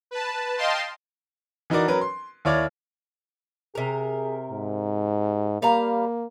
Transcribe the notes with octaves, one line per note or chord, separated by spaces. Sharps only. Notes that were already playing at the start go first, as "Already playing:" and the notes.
B4 A5
D#5 F5 G5 A5 C6
E3 D#4 F#4 A#4 D5
F#3 C#4 A#4 B4
C6
D#2 E4 C#5 D5 F6
C3 G#4 A#4
G#2
G3 A#3 F5 A#5